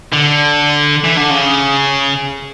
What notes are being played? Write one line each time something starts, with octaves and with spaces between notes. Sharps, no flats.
D3
E3
D3
C#3